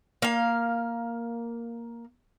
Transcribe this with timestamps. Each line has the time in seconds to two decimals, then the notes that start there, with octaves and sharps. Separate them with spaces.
0.22 A#3 F5